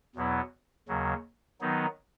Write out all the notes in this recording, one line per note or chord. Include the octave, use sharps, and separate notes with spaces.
E2 B2 F#3 B3 E4
D#2 C#3 F#3
D#3 F#3 B3 D#4